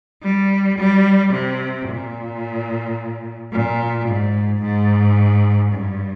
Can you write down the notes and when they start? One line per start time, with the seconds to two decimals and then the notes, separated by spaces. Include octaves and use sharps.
0.23 G3
0.78 G3
1.33 C3
1.88 A#2
3.52 A#2
4.08 G#2
4.62 G#2
5.73 G2